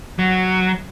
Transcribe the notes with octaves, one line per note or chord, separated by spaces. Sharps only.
F#3